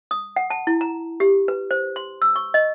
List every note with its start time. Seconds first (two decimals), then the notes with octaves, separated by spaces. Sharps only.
0.11 D#6
0.36 F#5
0.50 A5
0.67 E4
0.81 A#5
1.20 G4
1.48 B4
1.71 C5
1.96 C6
2.22 E6
2.36 C#6
2.54 D#5